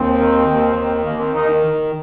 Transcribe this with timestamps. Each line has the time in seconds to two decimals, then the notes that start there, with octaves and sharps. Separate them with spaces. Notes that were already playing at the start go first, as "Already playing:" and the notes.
Already playing: D#2 C4
0.19 D#3
0.48 D#2
0.76 D#3
1.05 D#2 A#3
1.19 C4
1.34 D#3 D#4